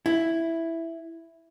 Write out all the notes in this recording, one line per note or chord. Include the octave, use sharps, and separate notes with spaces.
E4